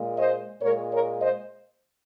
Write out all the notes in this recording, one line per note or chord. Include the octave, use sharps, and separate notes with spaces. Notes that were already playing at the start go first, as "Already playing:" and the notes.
Already playing: A#2 G#3
C5 D#5
A#2 G#3 A#4 C#5
A#4 C#5
C5 D#5